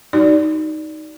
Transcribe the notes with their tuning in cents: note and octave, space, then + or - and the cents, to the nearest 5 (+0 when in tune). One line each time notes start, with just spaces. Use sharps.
D#4 +0 F#4 +25 D5 -10